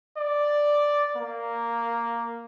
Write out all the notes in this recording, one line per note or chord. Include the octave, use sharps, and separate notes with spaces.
D5
A#3